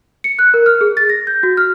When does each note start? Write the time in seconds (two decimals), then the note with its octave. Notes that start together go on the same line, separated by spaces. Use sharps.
0.24 C#7
0.39 F#6
0.54 A#4
0.66 F6
0.81 G#4
0.97 A6
1.09 A#6
1.27 G6
1.43 F#4
1.57 F6